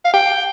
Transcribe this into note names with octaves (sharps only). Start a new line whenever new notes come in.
F5
G5